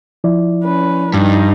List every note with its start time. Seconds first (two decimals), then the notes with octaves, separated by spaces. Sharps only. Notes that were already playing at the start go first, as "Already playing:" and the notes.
0.24 F3 E4 D5
0.64 C#4 B4
1.14 G2 D4 D#4